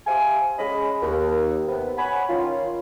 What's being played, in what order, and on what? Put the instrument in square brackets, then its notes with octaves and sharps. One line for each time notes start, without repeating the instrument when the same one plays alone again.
[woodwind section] G4 C5 E5 F5 G#5
G#3 C#4 D#5 B5
D#2
C3 B3
C#5 F#5 G#5 B5
D#3 C#4 F4